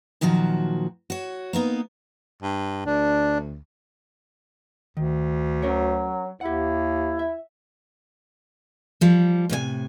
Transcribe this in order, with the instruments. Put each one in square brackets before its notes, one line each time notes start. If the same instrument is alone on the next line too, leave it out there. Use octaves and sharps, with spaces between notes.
[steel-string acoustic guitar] A#2 D#3 F3 F#3 F#4
F#4 C#5
A#3 B3 D#4
[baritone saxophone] G2
[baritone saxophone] D2 [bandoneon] D4
[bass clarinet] D2 [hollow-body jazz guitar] D#3
[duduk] F#3 [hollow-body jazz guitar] C#4 A#4 C#5
[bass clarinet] D#2 [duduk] E4 [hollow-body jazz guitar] G4 F#5
[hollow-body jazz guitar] E5
[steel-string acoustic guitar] F3 G3
A2 C3 C#5 G#5